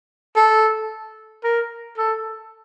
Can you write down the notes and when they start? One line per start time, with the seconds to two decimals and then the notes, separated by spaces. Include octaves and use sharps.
0.36 A4
1.44 A#4
1.97 A4